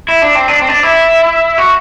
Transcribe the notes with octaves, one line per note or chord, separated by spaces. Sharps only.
E4
D4
C4
D4
C4
D4
E4
F#4